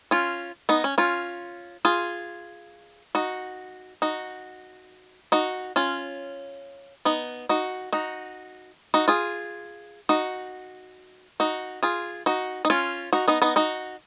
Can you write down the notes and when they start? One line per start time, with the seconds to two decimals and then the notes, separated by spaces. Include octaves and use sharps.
0.11 C#4 F4
0.69 B3 D#4
0.84 C#4
0.98 C#4 F4
1.85 F4 G#4
3.15 D#4 F#4
4.02 D#4 F#4
5.32 D#4 F#4
5.76 C#4 F4
7.05 B3 D#4
7.49 D#4 F#4
7.93 D#4 F#4
8.94 D#4 F#4
9.08 F4 G#4
10.09 D#4 F#4
11.40 D#4 F#4
11.83 F4 G#4
12.26 D#4 F#4
12.65 D#4
12.70 C#4 F4
13.13 D#4 F#4
13.28 B3 D#4
13.42 B3 D#4
13.56 D#4 F#4